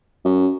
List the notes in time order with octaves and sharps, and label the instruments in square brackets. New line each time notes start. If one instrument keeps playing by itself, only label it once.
[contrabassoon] F#2